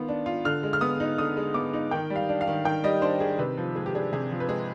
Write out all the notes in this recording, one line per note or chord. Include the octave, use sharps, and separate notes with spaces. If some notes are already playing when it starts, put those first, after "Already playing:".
Already playing: D#3 B3 F4
D4
F4
D3 F6
G#3
F6
B3 D#6
D#4
D3 D#6
G#3
B3 D6
D#4
D#3 G5
G3
F5
D4
F5
D#3
D#3 G5
G3 D#5
D4 C5
D#3 G#4
C3 B4
F3
G#3 G#4
G4
D4 G#4
C3 G#4
F3
B4
G#3 G#4